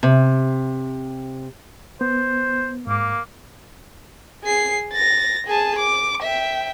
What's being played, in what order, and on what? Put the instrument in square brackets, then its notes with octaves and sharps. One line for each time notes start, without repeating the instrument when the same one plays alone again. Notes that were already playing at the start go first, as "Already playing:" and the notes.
[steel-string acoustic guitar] C3
[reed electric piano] B3 [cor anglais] C5
[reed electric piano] G#2 D6 [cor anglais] A#3
[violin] G#4 C7
A6 A#6
G#4 A5
D6
E5 G5